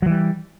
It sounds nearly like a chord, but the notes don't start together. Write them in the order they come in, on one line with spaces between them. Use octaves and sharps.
F#3 E3 G3